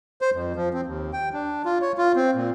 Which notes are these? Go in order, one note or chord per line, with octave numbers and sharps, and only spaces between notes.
C5
F2
F3
C4
D#2
G5
D4
F4
C#5
F4
C4
A#2